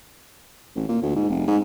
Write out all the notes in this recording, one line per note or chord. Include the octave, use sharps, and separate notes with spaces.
A1
A#2
D2
G#2
F1
G#2